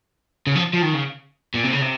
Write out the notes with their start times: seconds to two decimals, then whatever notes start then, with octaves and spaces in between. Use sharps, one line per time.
0.47 C#3
0.56 F3
0.74 F3
0.83 D#3
0.95 C#3
1.55 A#2
1.64 C3
1.73 C#3
1.82 C3